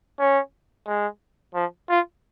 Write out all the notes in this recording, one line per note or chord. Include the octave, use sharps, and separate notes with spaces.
C#4
G#3
F3
F4